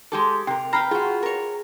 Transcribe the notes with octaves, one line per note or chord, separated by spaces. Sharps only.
G#3 G4 A4 D6
C3 A#4 G5
B4 G5 A#5 B5 F6 C7
F4 F#4 G#4
A#4 C#5